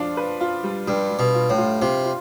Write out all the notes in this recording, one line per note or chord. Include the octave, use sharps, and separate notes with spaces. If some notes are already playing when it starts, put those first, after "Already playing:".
Already playing: F2 D4 F4
B4
F4
G3
G2 G3
G3
B2
F4
A2
F4
C3 F4
F4